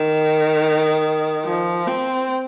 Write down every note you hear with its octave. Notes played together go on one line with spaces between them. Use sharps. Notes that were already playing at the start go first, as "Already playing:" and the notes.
Already playing: D#3
F3
C4